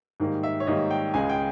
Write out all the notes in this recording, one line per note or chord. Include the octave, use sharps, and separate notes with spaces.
G#2 D#3 G3 A#3
E5
C#5
G#2 D#3 G3 A#3 D#5
G5
C#2 C#3 G#3 G#5
G5